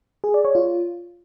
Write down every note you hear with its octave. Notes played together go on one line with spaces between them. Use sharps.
G#4
D5
C#5
F4